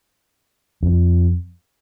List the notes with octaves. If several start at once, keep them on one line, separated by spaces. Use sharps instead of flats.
F2